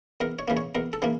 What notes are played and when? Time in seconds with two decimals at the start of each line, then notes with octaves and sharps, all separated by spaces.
0.21 E2 A#4
0.39 C#5
0.48 C#3 E3 A#3
0.57 C#5
0.75 E2 A#4
0.93 A4
1.02 C#3 E3 A#3